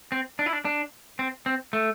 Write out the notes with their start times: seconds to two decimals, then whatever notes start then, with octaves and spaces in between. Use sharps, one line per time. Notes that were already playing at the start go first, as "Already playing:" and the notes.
0.12 C4
0.39 D4
0.46 E4
0.53 D4
0.65 D4
1.19 C4
1.46 C4
1.73 A3